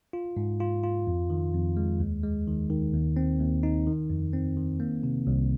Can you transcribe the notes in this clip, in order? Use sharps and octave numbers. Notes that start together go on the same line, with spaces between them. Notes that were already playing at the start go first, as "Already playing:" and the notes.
F4
G#2
F4
F4
F2
D#3
F2
G#3
D#2
G#3
D#3
D#3
D#2
C4
D#2
D#4
D#3
F2
C4
D#3
A#3
C3
C2